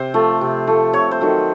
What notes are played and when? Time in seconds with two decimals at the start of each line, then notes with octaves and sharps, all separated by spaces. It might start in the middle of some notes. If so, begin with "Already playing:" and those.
Already playing: C3 C5
0.14 F3 A3
0.41 C3
0.67 F3 A3
0.93 C3 C#5
1.11 C5
1.21 D#3 F#3 A3